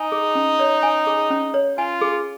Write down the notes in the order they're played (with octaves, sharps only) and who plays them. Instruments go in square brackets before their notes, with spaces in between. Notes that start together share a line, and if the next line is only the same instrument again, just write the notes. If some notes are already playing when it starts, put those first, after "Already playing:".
Already playing: [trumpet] D#4 [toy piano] G#5
[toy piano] G#4
C#4
C#5
G#5
G#4
C#4
C#5
[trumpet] F4 [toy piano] G#5
[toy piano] G#4